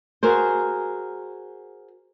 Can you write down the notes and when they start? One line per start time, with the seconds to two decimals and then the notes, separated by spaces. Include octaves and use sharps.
0.23 F#4 G#4 A#4 C5